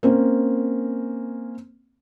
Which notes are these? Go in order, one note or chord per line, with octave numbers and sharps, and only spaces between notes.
A#3 C4 C#4